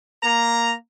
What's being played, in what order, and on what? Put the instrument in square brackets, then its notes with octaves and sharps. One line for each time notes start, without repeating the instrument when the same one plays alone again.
[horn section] A#3 A#5